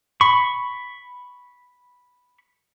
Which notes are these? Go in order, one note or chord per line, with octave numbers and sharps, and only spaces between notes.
B5 C#6